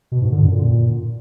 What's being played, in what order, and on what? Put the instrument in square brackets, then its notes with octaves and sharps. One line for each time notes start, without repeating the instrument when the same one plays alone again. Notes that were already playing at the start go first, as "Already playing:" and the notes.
[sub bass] B2
G#2
D3
F#2
A#2